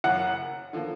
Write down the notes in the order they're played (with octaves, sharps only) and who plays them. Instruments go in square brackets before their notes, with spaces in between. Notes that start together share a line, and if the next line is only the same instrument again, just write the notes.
[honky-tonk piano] F#1 F#2 C#3 [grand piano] F#5
[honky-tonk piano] D3 F3 A#3